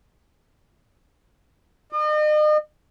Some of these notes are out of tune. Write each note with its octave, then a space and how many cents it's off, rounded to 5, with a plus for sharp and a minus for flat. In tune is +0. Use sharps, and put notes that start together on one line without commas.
D#5 -40